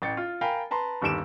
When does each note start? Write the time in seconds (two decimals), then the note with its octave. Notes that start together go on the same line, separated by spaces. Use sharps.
0.02 A1 G5 A6 C#7
0.17 F4
0.41 A#4 F5 G5 G#5 A#5 B5
0.71 B4 A5 A#5 C6
1.02 G1 D#2 G4 E6 D7 E7